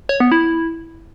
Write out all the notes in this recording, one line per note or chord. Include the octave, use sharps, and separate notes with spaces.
C#5
B3
E4